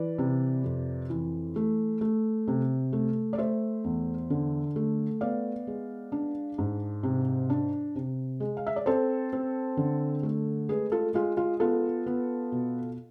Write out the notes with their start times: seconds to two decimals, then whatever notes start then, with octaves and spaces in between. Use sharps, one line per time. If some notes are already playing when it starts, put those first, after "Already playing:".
Already playing: E3 B4 D5
0.18 C3
0.64 F2
1.10 E3
1.56 A3
2.01 A3
2.48 C3
2.93 A3
3.33 D5
3.38 A3 C5 E5
3.84 E2
4.30 D3
4.76 A3
5.21 B3 D5 F5
5.67 G#3
6.12 D4
6.58 G#2
7.03 C3
7.50 D4
7.95 C3
8.40 G#3
8.57 F5
8.67 E5
8.76 D5
8.86 C4 A4 C5
9.33 C4
9.77 D3
10.23 A3
10.69 G#3 G#4 B4
10.92 F4 A4
11.14 G#3 F4
11.37 F4
11.60 B3 F4 A4
12.06 B3
12.52 B2